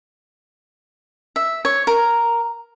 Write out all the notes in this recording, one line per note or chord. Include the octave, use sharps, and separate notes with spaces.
E5
C#5
A#4